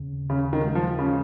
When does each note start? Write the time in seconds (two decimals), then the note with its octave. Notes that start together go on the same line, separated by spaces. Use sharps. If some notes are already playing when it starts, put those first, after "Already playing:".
Already playing: D#2 C#3
0.29 D#2 C#3
0.53 D#3
0.65 G#3
0.75 F3
0.99 C#3